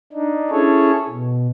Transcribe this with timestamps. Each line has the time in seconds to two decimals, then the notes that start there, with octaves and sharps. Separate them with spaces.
0.13 D4 D#4
0.51 C#4 E4 G#4 A4 C#5
1.09 B2